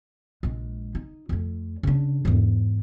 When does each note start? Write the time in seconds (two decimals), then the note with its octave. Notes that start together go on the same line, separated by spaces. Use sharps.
0.43 A#1 G#3
0.95 D#4
1.29 F2 A3
1.83 C#3 D4
2.25 E2 G#2